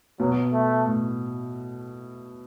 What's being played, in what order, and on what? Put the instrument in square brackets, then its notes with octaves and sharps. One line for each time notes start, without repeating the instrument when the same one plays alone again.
[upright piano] B2 [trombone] F#3
[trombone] A3
[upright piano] A2